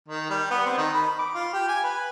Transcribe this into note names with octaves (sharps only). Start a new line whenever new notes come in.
D#3
G3
B3
C4
D#3
B5
D6
F4
G4
G#5
B4